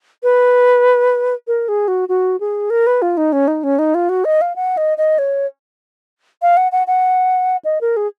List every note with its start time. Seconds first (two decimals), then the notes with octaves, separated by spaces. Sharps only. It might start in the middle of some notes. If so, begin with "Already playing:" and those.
0.23 B4
1.47 A#4
1.68 G#4
1.88 F#4
2.09 F#4
2.40 G#4
2.70 A#4
2.87 B4
3.02 F4
3.17 D#4
3.32 C#4
3.48 D#4
3.63 C#4
3.79 D#4
3.94 F4
4.09 F#4
4.25 D#5
4.41 F5
4.56 F#5
4.77 D#5
4.98 D#5
5.18 C#5
6.42 F5
6.57 F#5
6.72 F#5
6.87 F#5
7.65 D#5
7.81 A#4
7.97 G#4